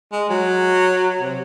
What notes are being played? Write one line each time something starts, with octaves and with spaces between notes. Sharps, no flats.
G#3
F#3
C3